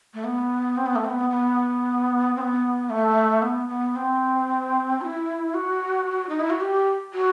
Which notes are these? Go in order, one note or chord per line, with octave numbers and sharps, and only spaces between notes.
A3
B3
C4
B3
A3
C4
B3
B3
C4
B3
A3
B3
B3
C4
F#4
E4
F#4
D#4
E4
F#4
G4
F#4